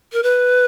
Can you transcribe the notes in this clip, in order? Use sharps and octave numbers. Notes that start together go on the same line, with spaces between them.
A#4
B4